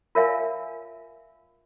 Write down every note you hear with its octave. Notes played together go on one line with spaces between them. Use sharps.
F4 A#4 C#5 E5 F5 G#5